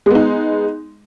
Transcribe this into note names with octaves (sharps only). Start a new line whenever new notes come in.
G#3 B3 D#4